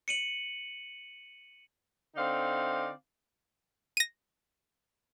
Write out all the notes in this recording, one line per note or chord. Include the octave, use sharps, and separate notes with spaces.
C#7 D#7 F#7
D3 C4 D#4 D5 F5
A#6 D#7